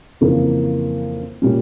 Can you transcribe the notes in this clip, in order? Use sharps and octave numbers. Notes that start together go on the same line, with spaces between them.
F2 C#3 E3 A#3
A#2 G3 C#4